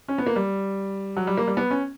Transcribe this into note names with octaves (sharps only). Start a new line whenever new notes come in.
C#4
B3
A#3
G3
F#3
G3
A#3
G3
B3
C#4